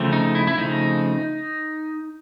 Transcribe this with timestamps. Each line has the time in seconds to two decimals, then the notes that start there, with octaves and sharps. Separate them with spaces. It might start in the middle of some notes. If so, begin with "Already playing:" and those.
Already playing: C#3 F3 A3 C4
0.13 D#4
0.35 E4
0.47 E4
0.58 C#3 F3 A3 C4 D#4